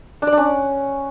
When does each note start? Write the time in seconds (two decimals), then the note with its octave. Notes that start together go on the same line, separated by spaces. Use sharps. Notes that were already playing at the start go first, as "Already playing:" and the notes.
0.22 D4
0.27 D5
0.32 D4
0.37 C#4